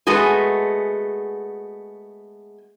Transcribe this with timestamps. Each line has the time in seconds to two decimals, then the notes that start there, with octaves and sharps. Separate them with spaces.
0.07 G#3 A3 B3 F#4 G#4